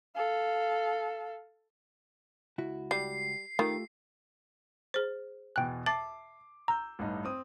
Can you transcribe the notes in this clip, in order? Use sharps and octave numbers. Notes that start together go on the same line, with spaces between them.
A4 F5
C#2 E4 F#4
G3 C7
D#3 A3 F4 G4
G#4 C5
E2 B2 G5 G#5 F#6
E5 A5 D6 A6 C7
A#5 E6 G6
A1 G2 D#4
C4 D#6